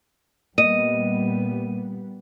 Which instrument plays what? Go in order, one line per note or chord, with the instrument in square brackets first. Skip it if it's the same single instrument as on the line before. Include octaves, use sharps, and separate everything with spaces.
[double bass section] A#2 G3 B3 [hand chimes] A#3 [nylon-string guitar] D#5 [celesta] D#7